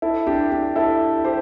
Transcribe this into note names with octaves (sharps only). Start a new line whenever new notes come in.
E4 A4
D4 G4
D4 G4
E4 A4
G4 C5